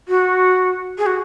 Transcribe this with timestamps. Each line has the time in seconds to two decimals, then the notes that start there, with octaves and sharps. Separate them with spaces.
0.08 F#4
0.98 G#4
1.06 F#4